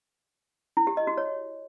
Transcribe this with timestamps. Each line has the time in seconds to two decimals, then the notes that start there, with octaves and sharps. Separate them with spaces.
0.77 E4
0.87 G4
0.97 D#5
1.07 F#4
1.17 C#5